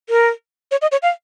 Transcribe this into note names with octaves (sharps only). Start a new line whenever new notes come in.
A#4
C#5
D#5
C#5
F5